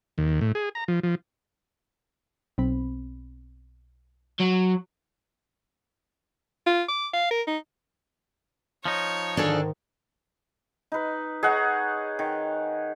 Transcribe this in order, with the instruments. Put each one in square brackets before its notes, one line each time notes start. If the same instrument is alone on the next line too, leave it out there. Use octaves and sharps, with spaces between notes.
[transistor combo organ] D#2
A2
G#4
A#5
F3
F3
[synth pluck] B1 C4 B5
[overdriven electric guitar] F#3
[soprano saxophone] F4
D6
F5
A#4
D#4
[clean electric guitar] F3 D#4 [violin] C#5
[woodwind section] G#2 D3 D#3 [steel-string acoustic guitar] D4 G#4 A4
[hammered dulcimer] D#4 B4
[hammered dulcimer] D#4 C#5 [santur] G#4 F#5
[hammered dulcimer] D#3